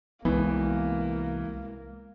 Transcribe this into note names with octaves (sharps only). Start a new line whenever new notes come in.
C2 E3 G#3 A#3 B3